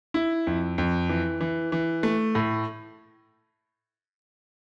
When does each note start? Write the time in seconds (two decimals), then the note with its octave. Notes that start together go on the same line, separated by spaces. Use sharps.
0.14 E4
0.47 F2
0.78 F2
1.09 E3
1.41 E3
1.72 E3
2.03 A3
2.35 A2